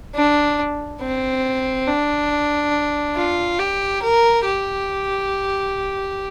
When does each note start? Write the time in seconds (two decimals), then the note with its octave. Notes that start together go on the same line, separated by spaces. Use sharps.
0.15 D4
1.01 C4
1.87 D4
3.16 F4
3.59 G4
4.03 A#4
4.45 G4